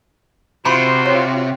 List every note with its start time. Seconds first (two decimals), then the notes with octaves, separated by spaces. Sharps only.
0.65 C3 F4 F#4 C5 B5 C6
1.06 C#5